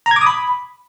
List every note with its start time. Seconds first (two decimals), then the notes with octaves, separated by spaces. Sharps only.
0.06 A#5
0.11 G#6
0.16 D6
0.21 D#6
0.26 B5